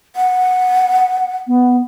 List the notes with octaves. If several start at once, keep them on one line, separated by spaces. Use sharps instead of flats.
F#5
B3